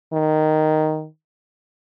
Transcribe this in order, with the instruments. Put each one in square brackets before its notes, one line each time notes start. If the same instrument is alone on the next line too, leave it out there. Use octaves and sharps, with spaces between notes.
[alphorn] D#3